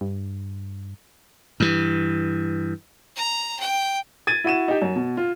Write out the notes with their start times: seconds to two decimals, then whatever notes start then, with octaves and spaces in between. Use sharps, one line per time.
0.01 G2
1.60 G2 E3
3.16 A#5
3.60 G5
4.27 G#6 A6 D#7
4.44 E4 F#4 D#7 E7
4.68 D#4 G4
4.82 F#2
4.96 B2
5.17 F4